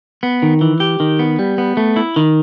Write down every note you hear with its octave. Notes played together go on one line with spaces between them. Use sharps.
B3
D#3
E3
G4
D#3
B3
G3
B3
A3
E4
D#3